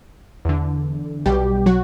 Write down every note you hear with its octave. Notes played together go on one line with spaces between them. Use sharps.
E2 D3
B1 B2 G3 G4
F#3 F#4